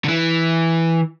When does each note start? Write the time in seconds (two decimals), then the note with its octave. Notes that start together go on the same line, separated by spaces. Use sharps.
0.04 D3
0.09 E3